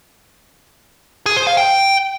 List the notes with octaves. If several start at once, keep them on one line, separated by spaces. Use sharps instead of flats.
G#4
C5
F5
G5